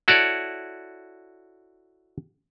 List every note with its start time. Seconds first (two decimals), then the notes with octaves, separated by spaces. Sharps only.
0.08 E4 F#4 A4 C#5 D5